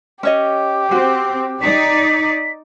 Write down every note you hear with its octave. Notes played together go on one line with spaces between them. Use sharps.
C#4 G4 C#5 D#5
C4 F#4
D#4 D5 B6